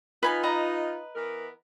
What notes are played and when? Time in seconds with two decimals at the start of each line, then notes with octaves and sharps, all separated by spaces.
0.23 D#4 F4 B4 G#5 B5
0.43 B4 D#5 A#5
1.15 E3 B3 A#4